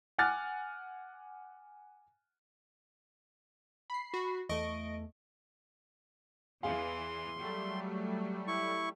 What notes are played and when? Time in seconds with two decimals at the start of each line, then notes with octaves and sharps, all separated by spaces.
0.18 F#5 G#5 D6 F6 F#6 A6
3.90 B5 C7
4.14 F#4
4.49 E2 A3 D#5 C#6 D7
6.63 E2 E3 G#4 F5 C6
7.38 F#3 G3 A3
8.47 E4 C#6